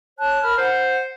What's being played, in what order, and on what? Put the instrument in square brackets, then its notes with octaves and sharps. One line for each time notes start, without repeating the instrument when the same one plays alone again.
[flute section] C#5 A5 F#6
A#4 B5 F6
[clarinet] C5 [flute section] F#5